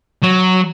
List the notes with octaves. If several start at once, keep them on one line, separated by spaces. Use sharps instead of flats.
F#3